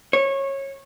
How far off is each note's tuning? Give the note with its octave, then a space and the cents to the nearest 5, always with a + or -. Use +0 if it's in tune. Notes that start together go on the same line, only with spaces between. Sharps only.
C#5 -20